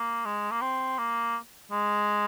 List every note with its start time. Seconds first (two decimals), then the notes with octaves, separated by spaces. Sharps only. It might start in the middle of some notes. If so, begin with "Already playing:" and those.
Already playing: A#3
0.25 G#3
0.51 A#3
0.61 C4
0.98 A#3
1.71 G#3